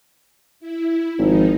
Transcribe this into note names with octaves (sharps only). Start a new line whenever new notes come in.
E4
G#1 F3 D#4